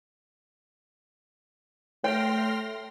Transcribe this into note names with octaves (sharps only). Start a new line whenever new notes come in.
A3 C#5 G5 C6 F6 A#6